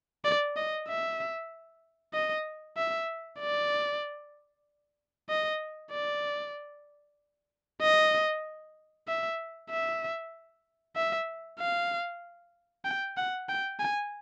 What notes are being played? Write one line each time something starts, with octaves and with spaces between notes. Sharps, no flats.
D5
D#5
E5
D#5
E5
D5
D#5
D5
D#5
E5
E5
E5
F5
G5
F#5
G5
G#5